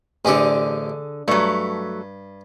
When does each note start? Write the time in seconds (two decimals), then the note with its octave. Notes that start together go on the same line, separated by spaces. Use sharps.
0.25 A1 D3 C4 G4 G#4
1.28 G2 F#3 A3